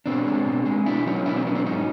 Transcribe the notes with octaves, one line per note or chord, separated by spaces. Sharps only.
B2 C4 D4
G#3
B2
G#3
B2 D4 E4
F#3 C#4 D#4
B2 D4 E4
C4 D4
F#3 B3 C#4
C4 D4
G#2 C#4 D#4